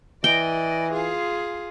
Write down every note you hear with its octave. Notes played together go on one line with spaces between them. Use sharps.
E3 D5 D#5 G5
F4 G#4